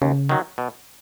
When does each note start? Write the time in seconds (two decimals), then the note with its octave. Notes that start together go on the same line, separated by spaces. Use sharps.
0.02 D#2 C#3
0.29 D#3 F#3
0.58 B2